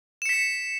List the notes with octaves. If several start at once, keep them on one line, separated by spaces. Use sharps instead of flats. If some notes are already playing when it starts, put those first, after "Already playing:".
B6 C#7 E7